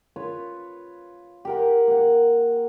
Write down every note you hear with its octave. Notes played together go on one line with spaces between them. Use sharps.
F4 B4 C#5
G4 A#4 F#5
A#3 F#5